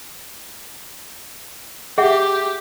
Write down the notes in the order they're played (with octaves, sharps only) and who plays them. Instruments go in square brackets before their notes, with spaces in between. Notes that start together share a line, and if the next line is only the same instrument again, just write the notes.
[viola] G4 [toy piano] G#4 E5 F#5